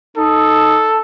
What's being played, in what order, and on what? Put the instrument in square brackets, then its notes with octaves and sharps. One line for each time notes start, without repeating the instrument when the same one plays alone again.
[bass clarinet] D#4 [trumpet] A4